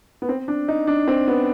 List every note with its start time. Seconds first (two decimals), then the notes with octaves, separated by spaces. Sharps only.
0.22 B3
0.29 C4
0.48 D4
0.68 D#4
0.87 D4
1.08 C4
1.28 B3